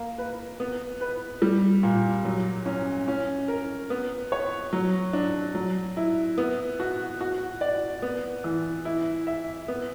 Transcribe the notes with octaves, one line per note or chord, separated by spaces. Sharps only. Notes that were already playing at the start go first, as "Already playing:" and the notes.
Already playing: A#3
B4
B3
B4
G3
A#2
F#3
C#4
C#4
A#4
B3
C#5
F#3
D4
F#3
E4
B3
F#4
F#4
D5
B3
E3
E4
E5
B3